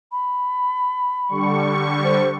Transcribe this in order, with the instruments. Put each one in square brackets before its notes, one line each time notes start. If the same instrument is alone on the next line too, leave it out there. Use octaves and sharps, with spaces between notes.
[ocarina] B5
[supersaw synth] D3 G3 C#6
[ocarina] C5